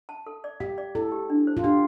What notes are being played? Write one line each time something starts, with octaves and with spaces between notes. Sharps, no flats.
A5
A4
D5
G4 F5
D5
E4 A4
G4
D4
C5
F4
D4 G4